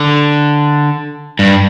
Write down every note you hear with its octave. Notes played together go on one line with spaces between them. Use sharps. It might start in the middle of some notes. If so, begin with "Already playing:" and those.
Already playing: D3
G2